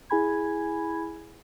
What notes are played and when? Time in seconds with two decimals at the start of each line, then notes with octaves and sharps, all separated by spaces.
0.10 E4 G#4 G#5 B5 G#6